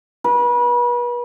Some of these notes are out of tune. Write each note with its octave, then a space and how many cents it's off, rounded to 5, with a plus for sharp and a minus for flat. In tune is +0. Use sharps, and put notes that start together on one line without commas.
B4 -35